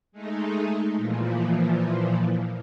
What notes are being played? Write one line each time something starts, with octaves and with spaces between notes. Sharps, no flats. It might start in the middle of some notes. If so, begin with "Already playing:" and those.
G#3 A3 D#4
A#2 E3 F3